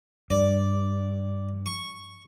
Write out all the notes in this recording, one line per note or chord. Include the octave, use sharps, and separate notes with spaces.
G2 D5
C#6